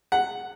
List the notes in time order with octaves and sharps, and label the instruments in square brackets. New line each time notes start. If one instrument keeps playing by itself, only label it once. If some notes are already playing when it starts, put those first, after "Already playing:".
[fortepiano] F#5